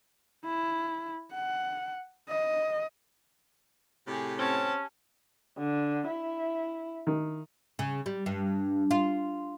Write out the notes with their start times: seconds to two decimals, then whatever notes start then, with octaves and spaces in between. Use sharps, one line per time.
0.46 E4
1.34 F#5
2.29 D#5
4.07 A2 C3 G4 G#4
4.39 C4 C#4 A5
5.58 D3
6.07 E4
7.07 D#3
7.79 C#3
8.06 G3
8.26 G2
8.91 F4